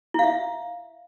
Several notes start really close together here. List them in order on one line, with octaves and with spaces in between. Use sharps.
E4 F5 E5